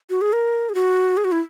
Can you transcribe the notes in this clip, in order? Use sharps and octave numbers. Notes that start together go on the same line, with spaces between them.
F#4
G#4
A#4
G#4
F#4
G#4
F#4
E4